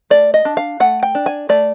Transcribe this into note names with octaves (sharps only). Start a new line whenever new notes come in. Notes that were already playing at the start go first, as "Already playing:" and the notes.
A3 D5
D#5
D4
F5
A3 F#5
G5
D4
G#5
A3 D5